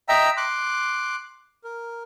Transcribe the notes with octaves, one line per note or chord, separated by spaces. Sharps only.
D#5 E5 G5 A#5 E6
C6 D6 F#6
A#4